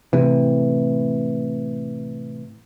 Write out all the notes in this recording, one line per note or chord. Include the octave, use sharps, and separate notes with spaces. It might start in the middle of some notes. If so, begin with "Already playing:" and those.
A2 C3 E3